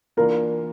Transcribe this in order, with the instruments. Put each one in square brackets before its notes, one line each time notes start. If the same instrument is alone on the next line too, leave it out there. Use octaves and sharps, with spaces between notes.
[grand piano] E3 A#3 D4 F4 [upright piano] A#4